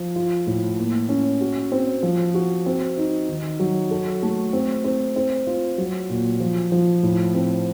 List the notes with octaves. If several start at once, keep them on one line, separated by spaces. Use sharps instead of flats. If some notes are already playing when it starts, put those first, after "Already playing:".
Already playing: F3
F4
A2
A#3
C#4
F#4
C4
F3
F#4
C4
D#4
D#3
F#3
A4
A3
C4
C4
C4
F4
F#3
A#2
F3
F3
A2
C4